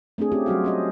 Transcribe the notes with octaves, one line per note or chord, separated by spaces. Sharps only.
A3 C4 D4 G#4
C4 C#4 F4 G4 G#4
F#3 G3 F#4 F5
C#4 C5 D#5